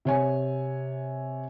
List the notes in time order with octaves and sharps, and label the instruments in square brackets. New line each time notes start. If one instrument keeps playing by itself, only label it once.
[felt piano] C3 C#5 G#5